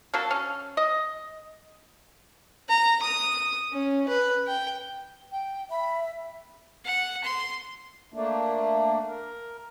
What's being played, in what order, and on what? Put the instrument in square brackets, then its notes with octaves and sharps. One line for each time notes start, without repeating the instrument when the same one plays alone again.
[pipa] A#3 D4 F#4 A4
C#4
D#5
[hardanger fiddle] A#5
D#6
C#4
B4
G5
[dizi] G5
[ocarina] E5 [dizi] B5
[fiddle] F#5
C6
[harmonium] A3 A#3 D4
A#4